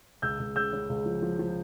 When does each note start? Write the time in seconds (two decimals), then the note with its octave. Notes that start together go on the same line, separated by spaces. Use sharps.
0.22 C#2 E6 G6
0.39 C#2
0.56 C#3 E6 G6
0.73 C#3
0.89 C#2
1.06 F3
1.22 F3
1.39 F3